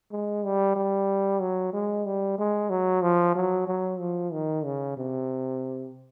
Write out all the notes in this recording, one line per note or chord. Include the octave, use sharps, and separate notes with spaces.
G#3
G3
G3
F#3
G#3
G3
G#3
F#3
F3
F#3
F#3
F3
D#3
C#3
C3